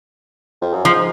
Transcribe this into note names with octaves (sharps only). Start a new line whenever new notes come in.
F2
F#2
G#2 F3